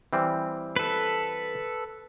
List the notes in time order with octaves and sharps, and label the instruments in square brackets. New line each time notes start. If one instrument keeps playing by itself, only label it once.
[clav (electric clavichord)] E3 G3 C4
[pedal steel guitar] A4 B4